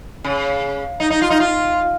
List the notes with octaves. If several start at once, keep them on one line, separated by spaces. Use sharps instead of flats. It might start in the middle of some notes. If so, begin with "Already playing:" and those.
C#3
D#4
D#4
F4
D#4
F4